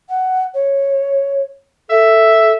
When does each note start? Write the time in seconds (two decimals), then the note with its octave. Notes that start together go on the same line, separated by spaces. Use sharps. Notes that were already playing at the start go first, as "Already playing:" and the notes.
0.08 F#5
0.54 C#5
1.89 A4 E5